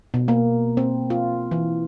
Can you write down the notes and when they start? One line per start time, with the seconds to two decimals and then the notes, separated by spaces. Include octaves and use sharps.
0.14 B2
0.28 A#3
0.77 C4
1.10 F4
1.51 E3